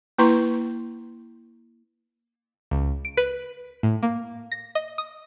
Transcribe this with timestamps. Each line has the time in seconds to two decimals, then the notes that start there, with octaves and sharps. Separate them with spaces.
0.18 A#3 E4 B4 A#5 C6 C#6
2.71 C#2
3.05 D7
3.17 B4
3.83 A2
4.03 A#3
4.51 A#6
4.75 D#5
4.98 D#6